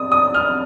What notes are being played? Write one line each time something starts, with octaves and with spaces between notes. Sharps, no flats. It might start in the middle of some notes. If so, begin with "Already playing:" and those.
Already playing: D#6
D#6
F6